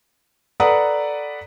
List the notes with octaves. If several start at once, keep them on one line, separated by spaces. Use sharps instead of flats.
A4 B4 D5 F#5 A#5 D#6